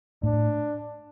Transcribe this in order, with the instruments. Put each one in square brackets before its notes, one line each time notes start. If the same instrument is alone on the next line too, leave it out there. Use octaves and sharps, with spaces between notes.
[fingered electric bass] A2 [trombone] D4